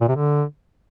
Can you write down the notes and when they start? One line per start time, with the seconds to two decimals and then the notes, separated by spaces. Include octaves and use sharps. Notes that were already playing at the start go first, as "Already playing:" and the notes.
0.01 A#2
0.08 C3
0.16 D3